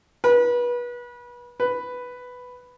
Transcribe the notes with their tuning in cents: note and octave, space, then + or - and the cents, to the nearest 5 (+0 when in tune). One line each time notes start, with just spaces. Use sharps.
B4 -30
B4 +5